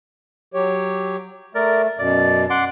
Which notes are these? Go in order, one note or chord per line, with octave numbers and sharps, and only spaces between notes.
F#3 G4 C#5
A3 A#4 D5
F#2 B2 D5
F#5 C6 D6